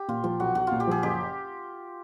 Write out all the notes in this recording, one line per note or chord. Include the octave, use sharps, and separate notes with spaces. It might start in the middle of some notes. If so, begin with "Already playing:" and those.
Already playing: G4
A#2 F4
F3 F4
B1 F#4
B1 F#4
A#2 F4
G4
F3 G#4
F#1 G4